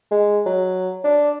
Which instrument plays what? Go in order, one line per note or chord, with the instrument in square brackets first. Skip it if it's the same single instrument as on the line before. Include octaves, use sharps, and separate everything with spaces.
[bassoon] G#3
F#3
D4